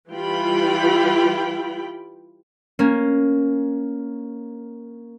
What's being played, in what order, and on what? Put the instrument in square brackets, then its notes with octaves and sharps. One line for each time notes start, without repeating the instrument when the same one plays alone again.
[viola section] E3 G3 F4 G5 B5
[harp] A#3 C#4